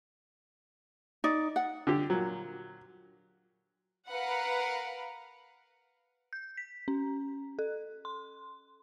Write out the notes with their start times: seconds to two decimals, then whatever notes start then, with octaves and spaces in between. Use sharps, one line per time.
1.24 D#4 D5
1.56 F#5
1.87 D3 G4
2.10 A#2 F#3
4.08 A#4 B4 F5 F#5
6.33 G6
6.57 B6
6.88 C#4
7.59 A4
8.05 C6